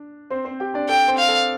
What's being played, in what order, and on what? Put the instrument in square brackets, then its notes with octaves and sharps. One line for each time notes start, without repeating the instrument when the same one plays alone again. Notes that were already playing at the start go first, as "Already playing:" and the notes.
Already playing: [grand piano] D4
C4 C5
C4 C5
G4 G5
D4 D5
[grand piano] A4 [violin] G5
[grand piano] C4 C5
[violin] F5
[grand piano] A4